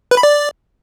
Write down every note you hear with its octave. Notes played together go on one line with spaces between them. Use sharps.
B4
B5
D5